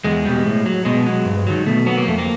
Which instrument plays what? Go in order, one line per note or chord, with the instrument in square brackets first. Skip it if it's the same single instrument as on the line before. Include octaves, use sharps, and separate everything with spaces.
[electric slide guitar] E2 G#3
B2 G3
A2
F#3
B2 G#3
F#3
G2
D#3 F#3
B2 A3
F#3 B3
A#3
F2 A3
A#3